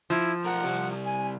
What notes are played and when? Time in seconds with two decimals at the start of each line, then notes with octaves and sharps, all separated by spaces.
0.10 F3 E4
0.46 B1 A#4 F#5
0.65 C2 G3
1.05 G#5